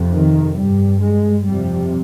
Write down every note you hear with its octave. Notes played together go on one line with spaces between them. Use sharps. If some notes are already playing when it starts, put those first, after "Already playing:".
Already playing: F2 C3
D#3
G2 G3
G#3
F2 C3 G3